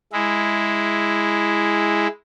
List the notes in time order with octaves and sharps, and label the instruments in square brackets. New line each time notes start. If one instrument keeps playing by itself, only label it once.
[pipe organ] G#3 E4